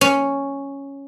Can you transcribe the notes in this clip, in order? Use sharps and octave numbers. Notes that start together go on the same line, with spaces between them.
C#4